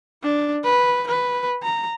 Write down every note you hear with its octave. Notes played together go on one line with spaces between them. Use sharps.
D4
B4
B4
A#5